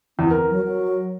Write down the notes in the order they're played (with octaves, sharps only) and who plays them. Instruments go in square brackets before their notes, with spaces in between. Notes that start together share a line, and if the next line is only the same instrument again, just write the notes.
[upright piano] E2 [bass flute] C4
[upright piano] A#4
[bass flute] F#3
F#3